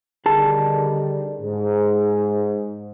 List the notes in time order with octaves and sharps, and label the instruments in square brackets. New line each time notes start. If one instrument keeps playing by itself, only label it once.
[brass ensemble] D3 D#3 G3 [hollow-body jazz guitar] G#4 A5
[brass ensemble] G#2